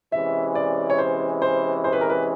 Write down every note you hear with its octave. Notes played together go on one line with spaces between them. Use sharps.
C3 E3 G#3 C#4 E5
D5
C#5
C5
C5
C5
B4
A#4
B4